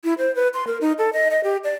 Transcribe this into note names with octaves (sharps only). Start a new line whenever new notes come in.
E4
C5
B4
C6
A#4
D#4
A4
D#5
D#5
G4
D5